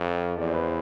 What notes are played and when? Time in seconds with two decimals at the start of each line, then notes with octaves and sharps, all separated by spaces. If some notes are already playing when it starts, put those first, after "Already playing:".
Already playing: F2
0.38 E2 D5
0.46 C5
0.54 B4
0.62 C5